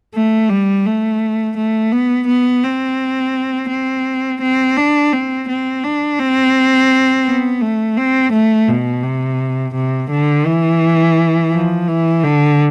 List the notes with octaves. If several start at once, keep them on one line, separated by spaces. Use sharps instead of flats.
A3
G3
A3
A3
B3
B3
C4
C4
C4
D4
C4
C4
D4
C4
B3
A3
C4
A3
B2
C3
C3
D3
E3
F3
E3
D3